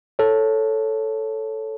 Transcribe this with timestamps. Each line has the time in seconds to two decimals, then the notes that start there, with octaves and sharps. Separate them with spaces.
0.19 A4 C#5